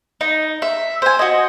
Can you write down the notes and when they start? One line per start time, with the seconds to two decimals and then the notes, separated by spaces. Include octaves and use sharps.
0.21 D#4
0.62 E5
1.02 C5 G#5
1.19 F#4 D#5